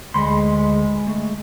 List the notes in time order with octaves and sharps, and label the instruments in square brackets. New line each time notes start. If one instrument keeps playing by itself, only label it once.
[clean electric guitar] D2 B5 C6 [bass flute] G#3
[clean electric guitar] A3